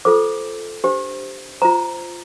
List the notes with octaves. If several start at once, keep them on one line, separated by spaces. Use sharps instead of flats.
F4 A4 C5 D6
D4 G4 C5
F4 C5 A#5